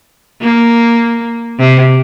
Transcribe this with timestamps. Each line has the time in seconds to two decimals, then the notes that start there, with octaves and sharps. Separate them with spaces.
0.41 A#3
1.59 C3